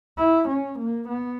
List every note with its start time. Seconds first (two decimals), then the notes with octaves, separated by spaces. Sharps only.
0.17 E4
0.48 C#4
0.78 A#3
1.09 B3